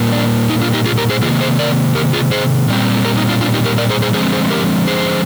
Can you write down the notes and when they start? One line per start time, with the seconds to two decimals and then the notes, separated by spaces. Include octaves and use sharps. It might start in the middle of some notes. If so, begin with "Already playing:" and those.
Already playing: A#2 G3 A#3
0.12 D4
0.49 D#4
0.61 D4 F4
0.74 D#4 G4
0.86 F4 G#4
0.97 G4 A#4
1.10 G#4 C5
1.22 C3 D#3 A#3 F4 G#4
1.41 G#4 C5
1.59 A#4 D5
1.95 G4 A#4
2.13 F4 G#4
2.31 G#4 C5
2.68 A#2 G3 C4
3.05 G4 A#4
3.17 D#4
3.29 D4 F4
3.41 D4 F4
3.54 D#4 G4
3.65 G4 A#4
3.78 A#4 D5
3.90 G#4 C5
4.02 G#4 C5
4.14 D3 F3 G#3 C4 G#4 C5
4.33 G#4 C5
4.51 G4 A#4
4.88 G#4 C5